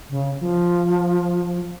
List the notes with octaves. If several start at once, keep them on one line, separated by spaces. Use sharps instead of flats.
C#3
F3